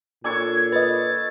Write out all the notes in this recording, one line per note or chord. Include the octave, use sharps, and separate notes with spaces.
A#2 D4 A4 C#5 G#6
B4 D#5 A6